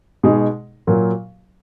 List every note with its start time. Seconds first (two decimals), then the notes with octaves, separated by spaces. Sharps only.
0.23 B2 G#3 D#4 G#4
0.87 A#2 F#3 A#3